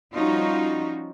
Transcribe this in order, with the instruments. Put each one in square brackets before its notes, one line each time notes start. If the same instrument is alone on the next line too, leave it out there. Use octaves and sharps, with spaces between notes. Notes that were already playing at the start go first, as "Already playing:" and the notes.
[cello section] F3 G3 C#4 D#4 F4 F#4